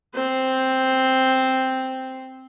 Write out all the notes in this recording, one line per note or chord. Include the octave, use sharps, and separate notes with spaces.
C4 C5